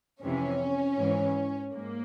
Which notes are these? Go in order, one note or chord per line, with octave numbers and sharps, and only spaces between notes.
F2 C3 E3 C#4
G#2 E3
G#2 A#3